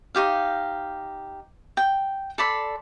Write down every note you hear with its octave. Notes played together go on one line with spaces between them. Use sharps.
D#4 F#4 G4 F5
G5
A4 D5 B5 C6